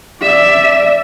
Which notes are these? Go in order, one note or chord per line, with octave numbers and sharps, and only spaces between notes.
D5 E5